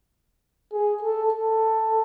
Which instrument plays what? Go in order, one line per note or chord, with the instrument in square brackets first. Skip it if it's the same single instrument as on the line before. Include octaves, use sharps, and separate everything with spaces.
[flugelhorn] G#4
A4
A4